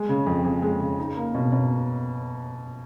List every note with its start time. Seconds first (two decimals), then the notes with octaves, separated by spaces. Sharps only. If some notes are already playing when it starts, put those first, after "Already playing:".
Already playing: G#3
0.09 C#3
0.26 F2
0.44 F2
0.62 G#3
0.80 C#3
0.98 D#4
1.16 A#3
1.34 B2
1.52 B2